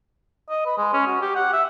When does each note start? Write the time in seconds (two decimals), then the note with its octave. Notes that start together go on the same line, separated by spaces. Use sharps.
0.50 D#5
0.66 B4
0.78 G#3
0.93 C#4
1.07 F#4
1.22 G4
1.36 F#5
1.54 E5